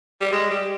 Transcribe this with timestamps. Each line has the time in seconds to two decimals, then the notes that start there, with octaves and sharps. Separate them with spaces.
0.21 G3
0.32 G#3
0.50 G3